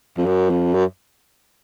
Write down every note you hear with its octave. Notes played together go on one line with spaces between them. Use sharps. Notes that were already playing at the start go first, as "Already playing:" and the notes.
F2
F#2
F2
F#2